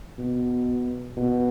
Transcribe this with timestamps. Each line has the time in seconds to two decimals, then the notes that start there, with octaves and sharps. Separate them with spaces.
0.19 B2
1.17 B2